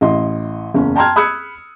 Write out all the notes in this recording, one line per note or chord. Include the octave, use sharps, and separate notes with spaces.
A1 E4 D#5 C6
F#1 E2 C#4
G5 A5 A#5 C6 F6 G#6
B5 D#6 E6 F#6 G#6 C#7